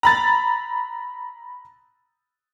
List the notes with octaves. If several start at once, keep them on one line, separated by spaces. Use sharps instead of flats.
A#5 B5 A6